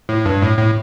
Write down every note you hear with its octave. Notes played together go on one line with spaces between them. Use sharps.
A2
G2
A2
A2